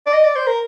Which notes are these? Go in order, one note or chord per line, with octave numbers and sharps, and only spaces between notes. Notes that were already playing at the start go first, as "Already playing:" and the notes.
D5
D#5
D5
C5
A#4